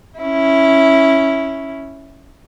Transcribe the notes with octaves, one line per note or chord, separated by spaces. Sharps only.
C#4 E4